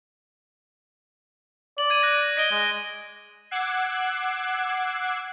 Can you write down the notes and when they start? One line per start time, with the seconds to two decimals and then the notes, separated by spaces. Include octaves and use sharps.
1.78 D5 F#7
1.90 G#6 D#7
2.03 F#6 A#6
2.37 D#5 A#6 D7 G7
2.51 G#3
3.51 F#5 D6 E6 F#6 G#6 C7